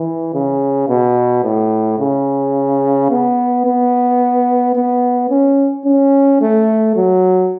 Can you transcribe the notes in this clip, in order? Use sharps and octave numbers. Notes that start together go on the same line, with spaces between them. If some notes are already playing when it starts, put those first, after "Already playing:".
Already playing: E3
C#3
B2
A2
C#3
B3
B3
B3
C#4
C#4
A3
F#3